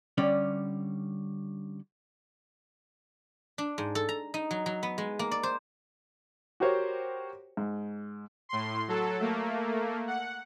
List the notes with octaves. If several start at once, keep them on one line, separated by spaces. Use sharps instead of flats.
D3 G3 C#4 D5
D4
G#2
A4
A#5
D#4
F#3
F#3
B3
G#3
A#3
D5
C5
F#4 G4 A#4 C5 C#5
G#2
A2 C6
F#3 A4
A3 A#3
F#5